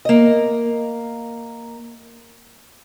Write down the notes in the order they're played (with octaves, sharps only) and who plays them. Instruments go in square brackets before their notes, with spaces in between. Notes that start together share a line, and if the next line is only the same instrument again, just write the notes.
[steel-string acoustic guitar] A#3 D#5